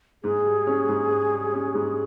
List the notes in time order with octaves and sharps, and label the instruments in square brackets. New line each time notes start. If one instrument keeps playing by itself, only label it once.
[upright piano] G#2 [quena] G#4
[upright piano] G3
C#4
G#2
G#2
G3
C#4
G#2